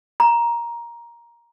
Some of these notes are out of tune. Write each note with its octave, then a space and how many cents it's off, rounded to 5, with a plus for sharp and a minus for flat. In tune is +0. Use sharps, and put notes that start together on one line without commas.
A#5 +15